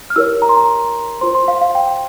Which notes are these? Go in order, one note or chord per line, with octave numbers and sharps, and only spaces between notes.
F6
E4 G4 A#4 C#5 E6
A#5
C6
A#5
F4 C5 C6
C6
F5
F5
G5